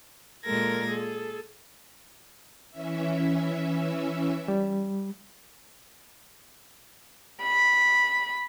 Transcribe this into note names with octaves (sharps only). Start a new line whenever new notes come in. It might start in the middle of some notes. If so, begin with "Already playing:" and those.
A#2 G#3 A4 A#4 G#6 A#6
G#4 A4
E3 C#4 E5
G3
B5